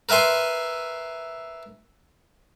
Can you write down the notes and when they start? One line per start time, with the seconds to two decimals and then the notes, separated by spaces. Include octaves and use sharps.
0.09 A#4 B4 E5 G#5 C6